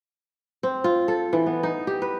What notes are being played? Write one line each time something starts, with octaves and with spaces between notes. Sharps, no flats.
C4
F4
A4
E3
B3
D#4
G4
B4